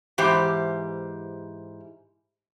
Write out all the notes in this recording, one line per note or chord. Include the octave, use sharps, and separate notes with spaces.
G#2 E3 G4 C5